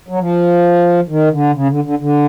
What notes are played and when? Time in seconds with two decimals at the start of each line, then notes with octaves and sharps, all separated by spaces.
0.08 F#3
0.19 F3
1.09 D#3
1.31 D3
1.54 C#3
1.68 D3
1.84 D3
1.99 D3